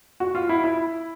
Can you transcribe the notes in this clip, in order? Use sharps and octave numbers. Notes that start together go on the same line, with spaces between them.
F#4
F4
E4
E4